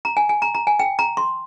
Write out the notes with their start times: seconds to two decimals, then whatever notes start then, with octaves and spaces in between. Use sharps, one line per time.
0.05 A#5
0.17 G#5
0.29 G#5
0.42 A#5
0.54 A#5
0.67 G#5
0.79 G5
0.99 A#5
1.17 C6